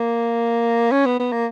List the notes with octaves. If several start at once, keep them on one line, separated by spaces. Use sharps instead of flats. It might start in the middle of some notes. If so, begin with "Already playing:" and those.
Already playing: A#3
C#4
B3
B3
A#3